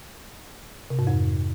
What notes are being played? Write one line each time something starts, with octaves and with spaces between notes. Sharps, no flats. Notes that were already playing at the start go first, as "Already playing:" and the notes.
C3
G#2
F2